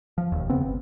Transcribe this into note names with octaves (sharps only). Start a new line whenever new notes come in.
F3
E1 D#2
C#3 B3 C4
G1